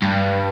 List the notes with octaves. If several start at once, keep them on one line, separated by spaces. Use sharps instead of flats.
G2